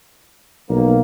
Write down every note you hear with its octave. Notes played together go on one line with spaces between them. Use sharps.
B1 A#3